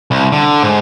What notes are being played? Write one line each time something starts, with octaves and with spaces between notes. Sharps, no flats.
C2
D3
G#2